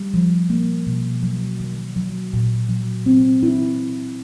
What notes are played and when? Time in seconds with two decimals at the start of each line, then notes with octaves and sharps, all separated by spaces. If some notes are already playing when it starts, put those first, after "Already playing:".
Already playing: G3
0.14 F3
0.50 A#3
0.87 B2
1.23 F#3
1.60 D#3
1.96 F#3
2.33 A#2
2.69 F#3
3.06 C4
3.43 E4